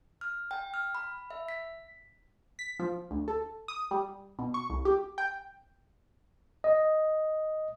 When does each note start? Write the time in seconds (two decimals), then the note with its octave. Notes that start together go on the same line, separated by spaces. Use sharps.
0.21 F6
0.51 G5
0.74 F6
0.95 B5
1.30 E5
1.48 B6
2.59 B6
2.79 F3
3.11 D2
3.28 A4
3.68 D#6
3.91 G3
4.39 B2
4.54 C#6
4.70 C2
4.85 G4
5.18 G5
6.64 D#5